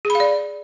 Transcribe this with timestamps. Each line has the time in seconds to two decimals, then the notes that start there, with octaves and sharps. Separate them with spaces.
0.05 G#4
0.10 B5
0.15 F5
0.20 D5